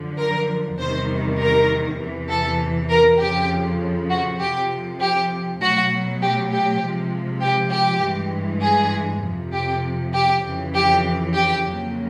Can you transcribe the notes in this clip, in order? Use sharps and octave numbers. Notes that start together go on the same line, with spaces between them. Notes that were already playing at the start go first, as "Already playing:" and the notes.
Already playing: F#2 D3 F3
A#4
E2 C3 D#3 G3 C5
A#4
E2 C3 E3
A4
A#4
F2 C#3 F3 G4
F#4
F2 C3 F3 G4
G4
B2 F#3 A3 F#4
G4
G4
C3 F3 G#3
G4
G4
G2 E3 G#3
G#4
F2 C3 F3
G4
G4
F2 C#3 E3
G4
G4
F2 C#3 F#3 A#3